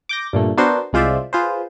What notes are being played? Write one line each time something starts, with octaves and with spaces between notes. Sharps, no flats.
D6 G6 A#6
G2 A#2 A3
B3 D4 F#4 A#4 C5
C2 G#3 F4 C5 D5 E5
F4 G#4 B4 C5